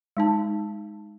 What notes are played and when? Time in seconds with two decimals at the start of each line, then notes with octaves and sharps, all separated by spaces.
0.17 G#3 D#4 A5